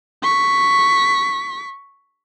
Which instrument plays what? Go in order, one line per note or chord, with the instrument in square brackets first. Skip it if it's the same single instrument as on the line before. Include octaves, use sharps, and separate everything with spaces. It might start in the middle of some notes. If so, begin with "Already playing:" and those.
[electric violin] C#6 B6